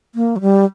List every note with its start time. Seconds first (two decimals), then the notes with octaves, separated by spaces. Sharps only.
0.15 A#3
0.36 F#3
0.41 G3